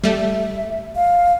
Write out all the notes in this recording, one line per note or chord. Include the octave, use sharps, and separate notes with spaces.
G3 A3 E5
F5